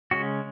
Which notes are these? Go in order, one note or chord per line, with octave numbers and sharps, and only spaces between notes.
C#3 G#3 C#4 F#4